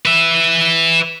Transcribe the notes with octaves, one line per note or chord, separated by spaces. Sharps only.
B4 E5